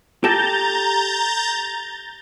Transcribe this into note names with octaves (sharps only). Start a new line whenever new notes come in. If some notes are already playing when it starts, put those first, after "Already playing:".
G4 A4 A5 A#5 G6 A6